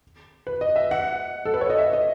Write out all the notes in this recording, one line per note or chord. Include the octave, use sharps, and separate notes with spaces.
B4
D#5
E5
F#5
A4
B4
C#5
D#5
E5
D#5